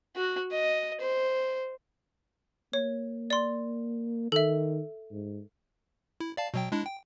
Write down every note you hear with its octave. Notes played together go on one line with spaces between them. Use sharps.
F#4
D#5
C5
A#3 C#5
D5 C6
D#3 A4 E5
G#2
E4
D5 F5 A5
B2 F#3 G5
G#3 D4 E4
G5